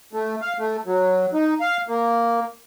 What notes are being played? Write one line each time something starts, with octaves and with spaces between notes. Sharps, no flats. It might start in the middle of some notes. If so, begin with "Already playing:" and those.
A3
F5
A3
F#3
D#4
F5
A#3